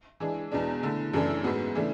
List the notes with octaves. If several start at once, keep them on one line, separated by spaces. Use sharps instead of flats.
E3 G#3 D4 G#4
E2 B2 G#3 D4
D3 A3 E4
F#2 C#3 E3 A3 D4
G#2 G#3 B3 F#4
C#3 E3 A3 D4